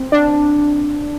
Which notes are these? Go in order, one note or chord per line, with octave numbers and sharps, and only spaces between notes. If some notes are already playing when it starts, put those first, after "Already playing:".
Already playing: C4
D4